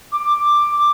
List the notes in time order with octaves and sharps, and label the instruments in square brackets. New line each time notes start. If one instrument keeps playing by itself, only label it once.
[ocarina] D6